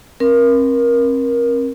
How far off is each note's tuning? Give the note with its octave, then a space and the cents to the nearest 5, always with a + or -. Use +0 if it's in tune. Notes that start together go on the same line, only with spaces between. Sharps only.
C4 +40 A#4 +20